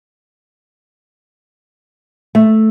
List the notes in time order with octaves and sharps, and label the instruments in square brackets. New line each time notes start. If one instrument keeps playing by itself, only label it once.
[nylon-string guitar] A3